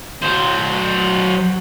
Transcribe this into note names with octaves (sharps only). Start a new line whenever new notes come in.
F#3 C5